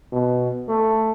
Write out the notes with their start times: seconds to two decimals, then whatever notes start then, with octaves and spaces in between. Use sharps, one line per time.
0.12 B2
0.69 A3